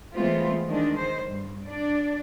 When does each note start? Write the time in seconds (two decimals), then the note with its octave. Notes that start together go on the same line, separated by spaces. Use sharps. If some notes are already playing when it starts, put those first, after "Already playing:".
0.14 E3 G#3 A3 B3 C4 F4
0.69 D#3 G#3 D4
0.99 D#3 C5
1.27 G2
1.67 D4 D5